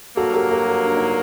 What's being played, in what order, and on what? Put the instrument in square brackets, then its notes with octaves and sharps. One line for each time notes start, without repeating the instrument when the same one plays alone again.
[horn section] G2 F#3 A#3 [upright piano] F#4 A4
[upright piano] G4 A#4
G4 A#4
F#4 A4
D4
D#4